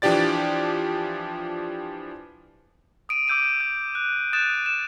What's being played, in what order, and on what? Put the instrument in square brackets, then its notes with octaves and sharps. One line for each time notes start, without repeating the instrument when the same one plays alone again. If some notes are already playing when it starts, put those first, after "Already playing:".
[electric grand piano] E3 F3 D4 G4 D5 A6
[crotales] D#6 D7 D#7
D6 E6 G6 D7 D#7
G6
F#6
D#6 F#6 G6 A6 D#7 E7
E7